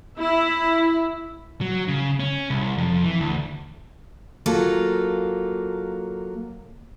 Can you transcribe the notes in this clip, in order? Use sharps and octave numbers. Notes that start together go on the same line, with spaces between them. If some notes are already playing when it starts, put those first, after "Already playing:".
E4
F#3
C#3
C#4
C2
F2
E3
D2
F#3 A#3 F4 A4